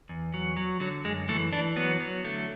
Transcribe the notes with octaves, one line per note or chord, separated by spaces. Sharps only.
E2
F#3
F#3
D3 F#3
F#2 G#3
E3 A3
E3 D4
F#3 B3
F#3
D3 A3